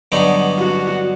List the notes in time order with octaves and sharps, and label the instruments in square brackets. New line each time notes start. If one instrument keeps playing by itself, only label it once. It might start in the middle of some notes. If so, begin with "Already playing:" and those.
[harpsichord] G2 D3 F#3 B3 D#4
[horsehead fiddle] F#4